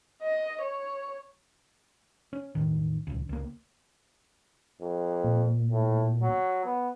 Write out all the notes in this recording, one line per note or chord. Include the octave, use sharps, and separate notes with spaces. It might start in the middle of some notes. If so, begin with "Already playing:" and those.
D#5
C#5
C#4
E1 A1 D#3
D#1 C#2
C#2 A#3
F2
A#2
A2
F#3
B3